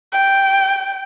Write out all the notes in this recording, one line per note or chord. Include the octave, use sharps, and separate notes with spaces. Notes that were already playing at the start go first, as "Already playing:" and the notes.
G5